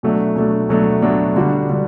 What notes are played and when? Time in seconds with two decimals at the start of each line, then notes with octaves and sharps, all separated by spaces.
0.03 B2 F#3 A3 D4
0.36 B2 F#3 A3 D4
0.69 B2 F#3 A3 D4
1.02 B2 F#3 A3 D4
1.36 D3 G3 D4 F#4
1.70 D3 G3 D4